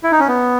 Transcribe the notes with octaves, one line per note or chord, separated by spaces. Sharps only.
E4
D#4
C#4
B3